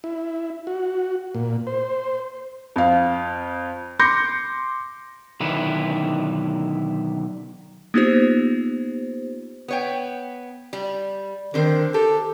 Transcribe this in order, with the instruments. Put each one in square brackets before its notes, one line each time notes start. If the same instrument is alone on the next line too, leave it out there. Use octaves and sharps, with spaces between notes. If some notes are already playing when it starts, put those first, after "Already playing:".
[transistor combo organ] E4
F#4
A#2
C5
[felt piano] F2 F5
C6 D6 G6 A#6 C#7
[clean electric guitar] B1 D3 D#3 E4 B4
[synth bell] A#3 B3 D#4 F4 G4 C5
[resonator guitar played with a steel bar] B3 C#5 G5
G3
[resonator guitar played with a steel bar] D3 C4 C5 [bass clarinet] D#3
[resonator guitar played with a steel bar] G4 [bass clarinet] A4